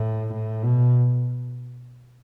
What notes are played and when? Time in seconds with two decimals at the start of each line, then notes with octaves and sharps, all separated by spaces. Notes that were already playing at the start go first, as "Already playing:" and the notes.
Already playing: A2
0.34 A2
0.63 B2